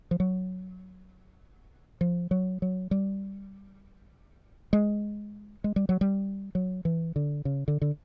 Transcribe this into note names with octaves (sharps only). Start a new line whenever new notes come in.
F3
F#3
F3
F#3
F#3
G3
G#3
G#3
G3
F#3
G3
F#3
E3
D3
C#3
D3
D3